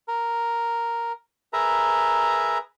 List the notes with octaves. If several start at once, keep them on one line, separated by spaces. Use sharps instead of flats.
A#4
G#4 A#4 B4 E5 A#5